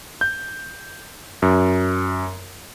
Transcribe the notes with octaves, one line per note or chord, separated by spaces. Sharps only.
G6
F#2